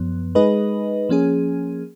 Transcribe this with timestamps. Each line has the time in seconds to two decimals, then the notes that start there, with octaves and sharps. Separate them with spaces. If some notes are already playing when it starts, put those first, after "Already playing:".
Already playing: F#2 F3 B3
0.35 G#3 D#4 G#4 B4 D#5
1.09 F3 A#3 C#4 G#4